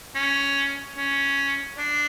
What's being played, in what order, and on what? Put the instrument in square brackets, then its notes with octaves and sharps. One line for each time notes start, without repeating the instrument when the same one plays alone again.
[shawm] C#4
C#4
D4